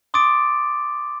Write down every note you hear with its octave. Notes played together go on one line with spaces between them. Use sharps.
C6 D6 D#6 A6 D7